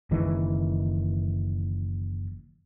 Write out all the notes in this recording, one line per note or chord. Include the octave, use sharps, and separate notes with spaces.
F#1 D#3 E3 G#3